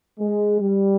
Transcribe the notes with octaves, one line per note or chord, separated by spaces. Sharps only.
G#3
G3